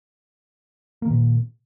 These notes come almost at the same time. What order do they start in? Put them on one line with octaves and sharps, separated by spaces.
A#3 D#3 A#2